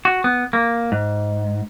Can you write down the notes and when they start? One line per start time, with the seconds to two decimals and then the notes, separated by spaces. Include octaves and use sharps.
0.05 F#4
0.24 B3
0.53 A#3
0.92 G#2